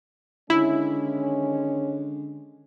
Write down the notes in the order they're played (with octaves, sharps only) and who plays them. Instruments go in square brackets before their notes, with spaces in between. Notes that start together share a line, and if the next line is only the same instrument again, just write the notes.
[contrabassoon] D3 [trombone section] D#3 G#3 C#4 [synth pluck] E4